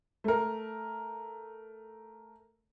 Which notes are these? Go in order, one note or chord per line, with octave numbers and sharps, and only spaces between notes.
A3 A#4